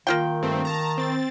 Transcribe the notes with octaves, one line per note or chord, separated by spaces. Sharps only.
D#3 A#3 F4 G5
G2 A3 C4
A5 A#5
C4 A6